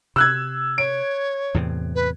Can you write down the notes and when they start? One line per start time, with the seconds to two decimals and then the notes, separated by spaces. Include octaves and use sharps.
0.16 C3 E6 F#6 G#6
0.78 C#5 D7
1.54 E2 A2 C3
1.95 B4